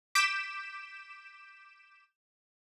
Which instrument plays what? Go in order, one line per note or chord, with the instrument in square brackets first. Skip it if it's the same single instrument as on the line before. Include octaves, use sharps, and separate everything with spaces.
[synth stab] D6 G6 B6 D7 E7